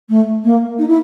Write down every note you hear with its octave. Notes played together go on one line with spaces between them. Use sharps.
A3
A#3
D#4
E4